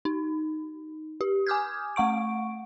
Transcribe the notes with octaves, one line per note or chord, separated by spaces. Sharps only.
D#4
G4
G#5 D6 D#6 F6 G6 G#6
A3 F#5 C#6 D7